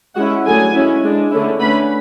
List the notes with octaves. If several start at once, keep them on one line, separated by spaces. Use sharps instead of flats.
G#3 C#4 E4 F#4 F#5
D3 F#3 A3 G#4 G#5
G#3 C#4 E4
G#3 D4
D3 A3 C#4 E4
D3 A3 C#4 B4 B5